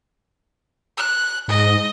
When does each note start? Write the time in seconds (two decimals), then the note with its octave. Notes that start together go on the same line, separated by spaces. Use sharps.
0.97 F#6
1.48 G#2 D#5